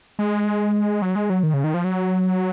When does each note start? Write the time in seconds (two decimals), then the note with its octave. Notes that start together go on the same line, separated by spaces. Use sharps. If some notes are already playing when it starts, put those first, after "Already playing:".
0.19 G#3
1.02 F#3
1.16 G#3
1.30 F#3
1.43 D#3
1.54 C#3
1.64 D#3
1.74 F3
1.84 F#3